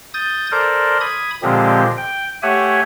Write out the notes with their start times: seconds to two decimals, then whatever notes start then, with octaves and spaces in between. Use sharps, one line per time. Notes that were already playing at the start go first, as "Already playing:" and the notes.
0.14 D#6 G6 A6
0.51 A4 A#4 C5 D5
1.01 B5 D#6 G#6
1.43 A#2 D3 F3 G#3 C4 G4
1.97 G5
2.43 A3 G4 C#5 E5 F#5 G#5